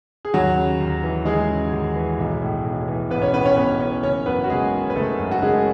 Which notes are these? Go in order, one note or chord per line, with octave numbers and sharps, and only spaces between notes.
G#4
D#2 F#3 F#4
C#3
D#2
E3
D#2 G#3 G#4
C#3
D#2
E3
B1
A2
B1
E3
B1 B3 B4
C#4 C#5
A2 B3 B4
C#4 C#5
B1 B3 B4
E3 C#4 C#5
F#1 C#4 C#5
F#2 B3 B4
F#4
F#1 G#3 G#4
D#3
B4
F#1 A3 A4
F#2
F#4
F#1 G#3 G#4